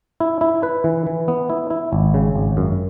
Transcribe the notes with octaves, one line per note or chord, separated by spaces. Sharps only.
E4
E4
B4
E3
E3
B3
E4
E4
G#1
C#3
G#1
F#2